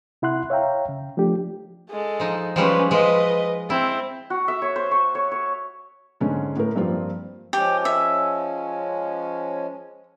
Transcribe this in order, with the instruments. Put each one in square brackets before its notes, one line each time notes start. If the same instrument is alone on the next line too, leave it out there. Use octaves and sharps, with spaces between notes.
[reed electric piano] C3 E4 F#5 C6 F#6
C#5 E5 F5 G5 A#5
C#3
F3 A3 D4 G4
[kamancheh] G#3 A4
[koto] F3 D#4
[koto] F3 G3 G#3 [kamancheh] C#4 B4
[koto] F3 G#3 [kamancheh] B4 D#5
[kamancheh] C4 [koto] E4
[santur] F#4
E5
C#5
C5
C#6
C#5
C#5
[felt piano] G#2 D3 C#4 G#4
A2 A#4
G2 F3 A#3 C4 F4
[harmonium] F3 G#3 C#4 [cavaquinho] G4
[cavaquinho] E5